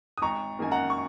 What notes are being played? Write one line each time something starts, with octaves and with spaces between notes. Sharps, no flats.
D#6
G#1 A#5 C#6
F#2 D#3 A#3 G#5
F#5 A#5
C#6